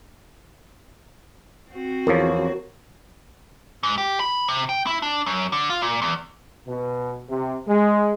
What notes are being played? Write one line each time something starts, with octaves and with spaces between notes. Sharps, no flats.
C4 F#4
E2 F3 A#4 C#5
G#2
G4
B5
C3
G5
E4
D4
F#2
D3
F4
A#2
E2
B2
C3
G#3